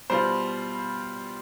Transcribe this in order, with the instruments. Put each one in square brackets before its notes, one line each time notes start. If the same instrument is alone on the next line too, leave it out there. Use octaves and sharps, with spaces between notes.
[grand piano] B2 G3 B3 F4 C5